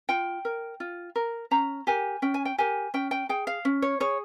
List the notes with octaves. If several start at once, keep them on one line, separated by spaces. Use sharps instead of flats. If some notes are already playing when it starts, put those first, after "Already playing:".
F4 G5
A#4
F4
A#4
C#4 A#5
G4 A#4 G#5
C#4 G5
G#5
G5
G4 A#4 G#5
C#4 G5
G5
G#4 G5
F5
C#4
C#5
G#4 C#5